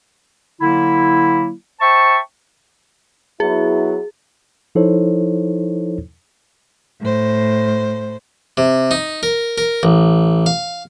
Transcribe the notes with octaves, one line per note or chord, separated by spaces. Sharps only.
D3 F#3 A#3 E4
C5 E5 G5 A5 C#6
F#3 B3 E4 G#4
F3 D#4 E4 A4 C5 C#5
A2 C5
C3
D#4
A#4
A#4
A1
F5